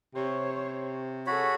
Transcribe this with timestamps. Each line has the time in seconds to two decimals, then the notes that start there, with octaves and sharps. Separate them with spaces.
0.15 C3 C5 C#5
1.27 F#4 G#4 A4 C#5 B5